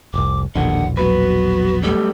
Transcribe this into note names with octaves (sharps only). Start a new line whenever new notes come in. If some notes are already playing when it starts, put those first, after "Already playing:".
F1 C2 D6
E1 A#1 D#2 D3 F#5
F#3 B3 F#4 B4
F#2 G3 A3 A4